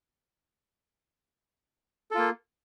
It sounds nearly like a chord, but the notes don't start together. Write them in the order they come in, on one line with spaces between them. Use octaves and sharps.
A4 F4 A#3